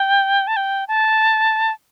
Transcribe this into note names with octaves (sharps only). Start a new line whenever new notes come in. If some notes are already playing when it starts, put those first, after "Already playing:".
Already playing: G5
A5
G5
A5